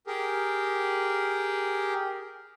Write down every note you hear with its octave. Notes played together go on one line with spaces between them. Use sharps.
G4 G#4 A#4